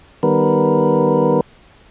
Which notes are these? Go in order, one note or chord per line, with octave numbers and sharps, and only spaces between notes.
D#3 G3 B3 A#4 B4